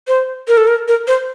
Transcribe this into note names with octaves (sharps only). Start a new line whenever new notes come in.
C5
A#4
A4
A#4
A#4
C5